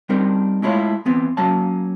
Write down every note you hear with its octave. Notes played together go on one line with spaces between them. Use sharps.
G3 C4 D4 D#4 A#4
G#3 A3 E4 F4 C#5 F5
E3 B3 C4
F#3 A#3 C#4 A5